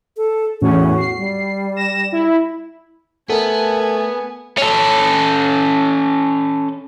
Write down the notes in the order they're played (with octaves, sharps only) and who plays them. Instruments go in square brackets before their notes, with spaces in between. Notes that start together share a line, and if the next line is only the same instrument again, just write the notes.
[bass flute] A4
[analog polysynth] E2 A2 C#4 [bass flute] F#4
[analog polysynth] C7
[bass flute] G3
[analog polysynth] A#6 E7
E4
[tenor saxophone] A3 [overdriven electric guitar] B3 [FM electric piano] A4 A#4 [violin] G#5
[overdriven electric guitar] C#4 A4